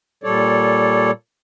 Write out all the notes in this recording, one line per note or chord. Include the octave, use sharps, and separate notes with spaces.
A#2 G3 A4 C#5 D5